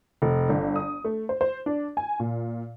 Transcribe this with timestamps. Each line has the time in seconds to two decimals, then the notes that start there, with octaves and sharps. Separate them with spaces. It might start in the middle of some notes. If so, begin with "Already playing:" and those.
0.22 F1
0.49 G1
0.76 D#6
1.05 A3
1.29 C5
1.41 C5
1.66 D4
1.97 G#5
2.20 A#2